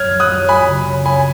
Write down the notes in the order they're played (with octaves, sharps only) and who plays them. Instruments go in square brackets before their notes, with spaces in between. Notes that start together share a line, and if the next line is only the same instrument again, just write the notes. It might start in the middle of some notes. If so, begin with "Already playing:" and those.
Already playing: [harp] F#2 [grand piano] F6 G#6
[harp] F#3
[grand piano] D#6 F#6
[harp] F#3
[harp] F#3 [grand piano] G#5 B5
[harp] C#3
F#3
[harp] F#3 [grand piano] G#5 B5